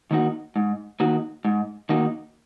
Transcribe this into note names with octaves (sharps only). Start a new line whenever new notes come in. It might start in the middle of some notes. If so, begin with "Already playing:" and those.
D#3 A#3 D#4 F#4
G#2
D#3 A#3 D#4 F#4
G#2
D#3 A#3 D#4 F#4